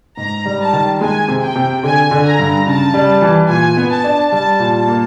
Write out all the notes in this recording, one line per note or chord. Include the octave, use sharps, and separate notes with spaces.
G#2 A#5
G3
A5
D#3
G#3 G#5
C3
G5
C3
D3 G#5
D3
A#5
G2
C#3 A5
G3
E3
A#2 G#5
B3
A5
D4
G3 A5
A#2
A5
A#3